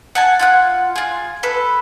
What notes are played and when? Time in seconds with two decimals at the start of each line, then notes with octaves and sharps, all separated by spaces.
0.15 F#5 G#5 A5
0.39 F4 F#5 F#6
0.96 F4 G#4
1.43 A4 B4